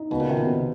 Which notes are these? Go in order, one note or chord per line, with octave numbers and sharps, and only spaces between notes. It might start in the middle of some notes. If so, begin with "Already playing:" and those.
Already playing: D#4
C#2 B2
A#2
C3 D#3
B2
C3